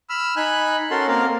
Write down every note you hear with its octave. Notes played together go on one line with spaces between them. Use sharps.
B5 E6 F6
D#4 G#5 B5 F#6
C#4 F#4 A4 A#4 C6
A#3 C4 A#4 F5